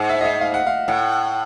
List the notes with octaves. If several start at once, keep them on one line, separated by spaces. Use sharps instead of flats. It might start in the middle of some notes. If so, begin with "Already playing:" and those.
Already playing: G#2
E5
D#5
E5
F5
F#5
F5
A2 F#5